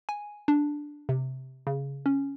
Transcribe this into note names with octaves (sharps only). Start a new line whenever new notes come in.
G#5
D4
C3
C#3
C#4